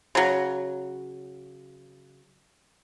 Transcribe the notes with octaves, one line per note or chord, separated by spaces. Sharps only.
C#3 F#3